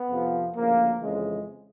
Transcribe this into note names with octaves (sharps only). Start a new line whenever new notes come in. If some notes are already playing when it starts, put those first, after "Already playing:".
Already playing: B3
F2 C3 F3
D2 C#3 F3 A#3
F2 C#3 E3 G#3